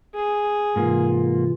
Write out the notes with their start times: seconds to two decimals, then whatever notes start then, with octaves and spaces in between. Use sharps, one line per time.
0.15 G#4
0.76 G#2 C3 E3 A#3 F4